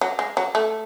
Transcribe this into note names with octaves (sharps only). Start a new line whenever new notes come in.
F#3
G#3
F#3
A3